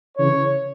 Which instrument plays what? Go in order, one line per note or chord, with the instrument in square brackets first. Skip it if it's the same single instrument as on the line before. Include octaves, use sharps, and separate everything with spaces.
[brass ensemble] C#3 E3 C#5